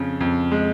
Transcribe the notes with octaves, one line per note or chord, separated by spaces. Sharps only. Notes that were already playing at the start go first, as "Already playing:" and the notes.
Already playing: F2 C#3
F2
G#3